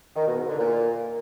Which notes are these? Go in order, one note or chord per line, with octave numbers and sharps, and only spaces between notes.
D#3
B2
G#2
D3
A#2